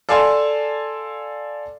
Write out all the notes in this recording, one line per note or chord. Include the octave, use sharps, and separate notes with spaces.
A4 D5 F5 G#5 A5 C6